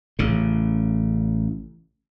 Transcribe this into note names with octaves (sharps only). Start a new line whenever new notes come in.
A1 C#3